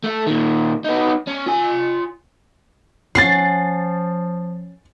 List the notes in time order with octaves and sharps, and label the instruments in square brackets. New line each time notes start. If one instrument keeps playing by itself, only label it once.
[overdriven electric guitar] A3 A4
A#2 D#3
B3 D#4
C#4
F4 G#5
[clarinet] F3 [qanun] C#4 F#5 C#6 [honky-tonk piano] A6 C7